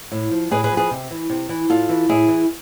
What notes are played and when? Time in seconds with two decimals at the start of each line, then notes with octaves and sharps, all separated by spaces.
0.12 A2
0.31 F3
0.51 A2 G#4 B4
0.64 G#4 B4
0.71 F3
0.77 G#4 B4
0.91 C3
1.11 E3
1.30 C3
1.49 E3
1.69 A2 F4 A4
1.89 E3
2.09 A2 E4 G#4
2.28 E3